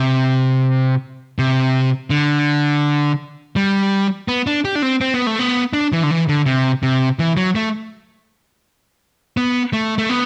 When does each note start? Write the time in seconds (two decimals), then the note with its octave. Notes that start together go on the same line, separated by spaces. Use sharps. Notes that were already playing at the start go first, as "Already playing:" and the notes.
Already playing: C3
1.39 C3
2.10 D3
3.56 G3
4.28 B3
4.47 D4
4.65 G4
4.75 D4
4.82 C4
5.01 C4
5.14 B3
5.27 A3
5.39 B3
5.73 D4
5.92 E3
6.03 D3
6.11 E3
6.29 D3
6.46 C3
6.83 C3
7.19 E3
7.37 F#3
7.55 A3
9.37 B3
9.73 A3
9.98 A3
10.09 B3